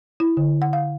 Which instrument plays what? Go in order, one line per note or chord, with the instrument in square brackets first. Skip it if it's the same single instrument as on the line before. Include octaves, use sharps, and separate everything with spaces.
[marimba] E4
D3
F#5
F5